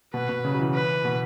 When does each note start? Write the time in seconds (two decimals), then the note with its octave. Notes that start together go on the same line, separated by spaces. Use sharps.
0.14 B2 B4
0.29 B2
0.45 C#3
0.53 F#3
0.59 E3
0.74 B4
1.05 B2